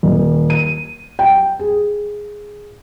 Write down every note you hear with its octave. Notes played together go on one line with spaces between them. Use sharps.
D#1
D#7
G5
G#4